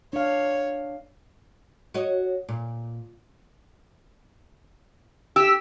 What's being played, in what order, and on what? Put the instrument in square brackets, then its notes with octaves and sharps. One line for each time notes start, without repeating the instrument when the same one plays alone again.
[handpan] D4 F5 [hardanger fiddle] C#5
[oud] F#4 C#5 D#5
A#2
[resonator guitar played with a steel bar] G4 [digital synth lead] E6